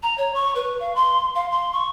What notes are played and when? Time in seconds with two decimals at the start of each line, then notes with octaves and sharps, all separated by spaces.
0.03 A#5
0.18 C#5
0.34 C#6
0.55 B4
0.80 F5
0.95 C6
1.35 F5
1.51 C6
1.73 C#6